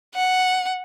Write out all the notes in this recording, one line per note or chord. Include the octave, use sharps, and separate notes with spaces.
F#5